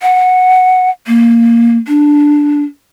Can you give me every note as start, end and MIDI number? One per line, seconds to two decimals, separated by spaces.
0.02 0.90 78
1.07 1.77 58
1.88 2.62 62